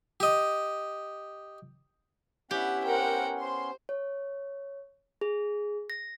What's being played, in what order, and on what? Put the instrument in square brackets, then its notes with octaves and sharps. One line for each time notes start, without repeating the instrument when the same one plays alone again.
[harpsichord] G4 D#5
[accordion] B3 C#4 [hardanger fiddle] E4 F#5 [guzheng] G4
[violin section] A#4 C5 F#5 [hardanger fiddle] G5
[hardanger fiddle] C5 [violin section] C6
[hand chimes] C#5
G#4
A#6